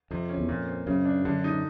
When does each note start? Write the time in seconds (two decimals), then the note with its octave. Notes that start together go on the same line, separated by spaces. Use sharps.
0.11 F2 C3
0.29 C#4
0.38 E2
0.49 F2 A#2
0.68 C4
0.87 F#2 C#3
1.05 D4
1.25 F#2 D3
1.44 D#4